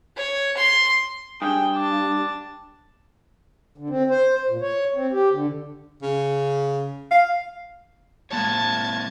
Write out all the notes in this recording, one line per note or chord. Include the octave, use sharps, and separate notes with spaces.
C#5
C6
G2 G#4 G5
D4 A5
D3
C4
C5
A#2
C#5
C4
G4
D3
C#3
F5
G#3 A#3 C#5 A5 G#6